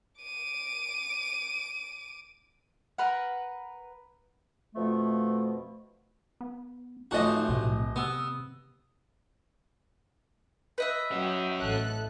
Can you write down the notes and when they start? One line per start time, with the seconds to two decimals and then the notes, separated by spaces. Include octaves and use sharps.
0.21 D6 D#7
2.98 A#4 B4 F#5
4.75 F2 B2 F3 A3
6.41 B3
7.11 D1 F3 A3 D#4 F#4 C#5 D#5
7.48 B1 A2 C3
7.96 C3 B3 D#6 E6
10.78 B4 D#5 E5
11.12 F#3 C#4 F#4 G5
11.61 A1 A4 F#6